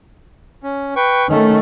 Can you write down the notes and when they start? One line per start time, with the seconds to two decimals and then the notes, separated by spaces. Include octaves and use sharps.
0.63 C#4
0.96 B4 G5 C#6
1.29 D#3 A3 C#4